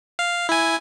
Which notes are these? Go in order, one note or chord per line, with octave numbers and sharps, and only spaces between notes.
F5
E4 G#5